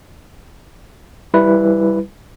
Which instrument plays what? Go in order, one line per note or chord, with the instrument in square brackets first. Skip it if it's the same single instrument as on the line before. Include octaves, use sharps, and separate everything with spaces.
[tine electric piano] G3 E4 B4